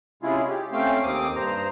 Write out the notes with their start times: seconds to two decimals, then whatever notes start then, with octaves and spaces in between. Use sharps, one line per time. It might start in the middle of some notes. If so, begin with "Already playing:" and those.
0.23 C3 G#3 C#4 E4 F4 G#4
0.49 G4
0.72 A3 C4 C#4 C5 F5 G5
1.03 D#2 A#3 C4 D6 D#6
1.36 G2 C5 A#5